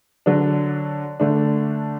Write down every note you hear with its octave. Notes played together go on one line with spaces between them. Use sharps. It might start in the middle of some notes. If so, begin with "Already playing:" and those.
D3 F#3 D4
D3 A3 D4